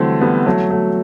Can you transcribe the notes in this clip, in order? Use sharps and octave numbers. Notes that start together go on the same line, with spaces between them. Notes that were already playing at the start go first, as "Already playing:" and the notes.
Already playing: D3 E3 F#3 G3 A3 C4
G3 B3
F#3 A3
F#3 A3